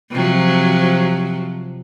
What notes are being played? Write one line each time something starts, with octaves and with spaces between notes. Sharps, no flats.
C3 F3 F#3